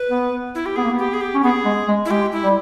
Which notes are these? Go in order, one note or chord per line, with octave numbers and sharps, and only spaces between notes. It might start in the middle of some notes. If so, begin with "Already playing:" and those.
Already playing: B4
B3
E4
G4
B3 G#4
A#3
B3
G4
G#4
G4
C#4
B3 G#4
G#3
G#3
E4
G#3 G4
E4
G3